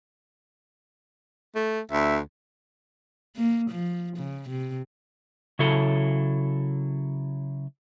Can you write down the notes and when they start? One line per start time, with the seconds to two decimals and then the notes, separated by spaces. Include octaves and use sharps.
1.55 A3
1.91 D2 E5
3.36 A#3
3.70 F3
4.17 C#3
4.49 C3
5.59 C#3 F#3 E4 A4